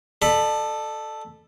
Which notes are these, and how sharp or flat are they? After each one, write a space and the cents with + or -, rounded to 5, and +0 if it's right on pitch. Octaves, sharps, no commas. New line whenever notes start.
A4 +0 D5 +45 B5 +0